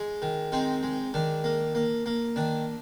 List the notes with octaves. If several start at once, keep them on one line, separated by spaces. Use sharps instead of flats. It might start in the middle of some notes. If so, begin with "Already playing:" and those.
Already playing: G#3
D#3
G#3 C4 D#4
G#3
D#3 D4
A#3
A#3
A#3
D#3 D4